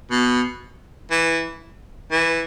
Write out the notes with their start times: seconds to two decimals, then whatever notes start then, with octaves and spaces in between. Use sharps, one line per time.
0.11 B2
1.11 E3
2.12 E3